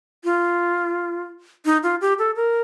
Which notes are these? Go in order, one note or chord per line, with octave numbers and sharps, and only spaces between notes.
F4
D#4
F4
G4
A4
A#4